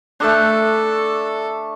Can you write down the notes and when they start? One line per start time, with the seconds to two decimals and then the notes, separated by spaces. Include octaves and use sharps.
0.20 A3 D4 A4